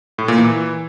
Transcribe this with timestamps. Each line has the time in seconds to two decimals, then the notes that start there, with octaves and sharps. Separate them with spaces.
0.18 A2
0.28 A#2
0.38 E3